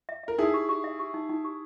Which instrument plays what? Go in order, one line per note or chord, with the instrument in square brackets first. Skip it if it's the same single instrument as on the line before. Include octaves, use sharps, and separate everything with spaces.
[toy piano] E5
[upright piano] A#4 [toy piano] E5
[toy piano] D#4 [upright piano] E4 G#4
[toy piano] G4
G4
E5
G4
D#4
D#4
G4